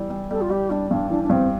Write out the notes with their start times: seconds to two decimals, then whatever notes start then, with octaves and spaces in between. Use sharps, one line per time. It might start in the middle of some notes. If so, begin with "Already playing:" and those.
Already playing: E3 G3
0.10 G3
0.31 G3 A4
0.41 F4
0.50 G3 G4
0.70 G3 D4
0.91 G2 D4
1.10 E3 D4
1.23 D4
1.30 G2 C4